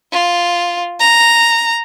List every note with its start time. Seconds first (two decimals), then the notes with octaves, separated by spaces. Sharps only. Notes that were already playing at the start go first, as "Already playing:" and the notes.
0.12 F4
1.00 A#5